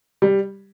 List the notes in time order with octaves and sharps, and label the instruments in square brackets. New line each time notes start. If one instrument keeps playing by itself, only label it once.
[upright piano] G3